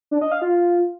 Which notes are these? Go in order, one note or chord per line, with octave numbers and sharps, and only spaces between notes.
D4
D#5
F5
F4